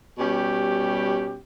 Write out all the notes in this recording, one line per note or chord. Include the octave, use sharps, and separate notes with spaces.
B2 G3 C#4 G4